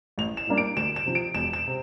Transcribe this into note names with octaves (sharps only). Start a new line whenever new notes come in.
A1 F7
E7
A2 G3 A#3 D4
D7
D2 E7
E7
C3 F3
D7
E1 E7
E7
C3